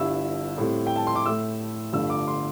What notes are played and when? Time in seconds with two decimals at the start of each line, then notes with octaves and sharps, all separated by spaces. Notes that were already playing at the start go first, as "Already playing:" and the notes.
Already playing: G1 G2 G3 E4 E6
0.58 A2 G3 C4
0.87 G5
0.96 A5
1.07 C6
1.16 D6
1.26 A2 A3 E4 E6
1.93 G1 G2 D3 A3 E6
2.10 D6
2.28 C6